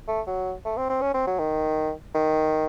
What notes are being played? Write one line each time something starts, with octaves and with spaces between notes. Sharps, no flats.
A3
F#3
A3
C4
C4
C#4
C4
F#3
D#3
D#3